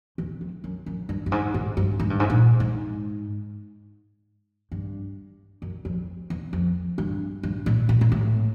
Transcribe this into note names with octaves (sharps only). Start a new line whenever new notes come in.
E2
F2
F#2
F#2
G2
G2
G#2
G#2
G2
G#2
G2
G#2
A#2
G#2
G2
F#2
F2
E2
F2
G2
G2
A2
A#2
A#2
A2